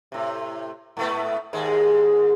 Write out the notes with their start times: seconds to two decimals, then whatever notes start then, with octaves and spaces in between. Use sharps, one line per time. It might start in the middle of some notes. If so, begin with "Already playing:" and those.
0.12 A2 C3
0.97 G#2 A3 B3
1.53 D#2 G#2 G#3